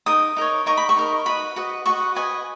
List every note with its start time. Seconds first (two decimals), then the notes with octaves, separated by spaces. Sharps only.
0.06 D#4 A#4 D#6
0.37 D#4 A#4 C#5
0.66 D#4 A#4 D#5 C#6
0.77 B5
0.89 C#6
0.96 D#4 A#4 D#5
1.25 F#4 B4 D#5 B5
1.56 F#4 B4 D#5
1.86 F#4 B4 D#5 C#6
2.15 F#4 B4 D#5 G#5